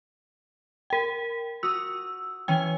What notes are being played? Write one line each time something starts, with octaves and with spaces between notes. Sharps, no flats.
A#4 G5
F#4 D#6 E6
E3 C#4 G5